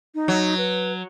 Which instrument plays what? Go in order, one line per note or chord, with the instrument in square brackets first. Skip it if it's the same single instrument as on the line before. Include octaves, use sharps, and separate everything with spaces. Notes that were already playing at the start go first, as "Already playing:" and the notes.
[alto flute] D#4
[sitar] F#3
[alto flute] B4